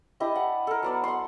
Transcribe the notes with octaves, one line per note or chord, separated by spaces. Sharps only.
D4 E4 G4 D#5
F#5
A4 A#4
F#3 B3 D5
F#5 C6